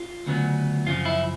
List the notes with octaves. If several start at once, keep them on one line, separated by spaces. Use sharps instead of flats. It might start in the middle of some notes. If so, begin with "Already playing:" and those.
Already playing: F4
D2 C#3 F#3 B3
F#2 C#3 F3 F4
E4